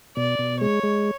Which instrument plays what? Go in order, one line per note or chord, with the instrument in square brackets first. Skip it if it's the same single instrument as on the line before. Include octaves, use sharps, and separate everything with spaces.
[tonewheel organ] B2 [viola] D5
[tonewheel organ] B2
[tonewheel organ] G#3 [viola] C#5
[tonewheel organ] G#3